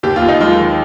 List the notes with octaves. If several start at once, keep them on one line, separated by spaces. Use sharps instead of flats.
D#2 G4
F4
D#2
D#4
G#3 F4
D#3